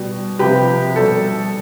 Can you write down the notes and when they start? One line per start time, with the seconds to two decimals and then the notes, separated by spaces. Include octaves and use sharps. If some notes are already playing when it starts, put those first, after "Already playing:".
Already playing: B2 G3
0.39 C3 F3 G4 B4
0.96 B2 G3 A4